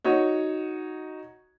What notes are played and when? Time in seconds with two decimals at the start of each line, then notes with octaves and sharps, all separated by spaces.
0.05 D#4 F#4 C#5